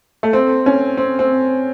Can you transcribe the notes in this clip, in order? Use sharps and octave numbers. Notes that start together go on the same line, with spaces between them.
A3
C4
C#4
C4
C4